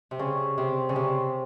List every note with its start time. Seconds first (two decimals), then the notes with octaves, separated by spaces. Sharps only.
0.11 C3
0.19 C#3
0.58 C3
0.89 C#3
0.96 C3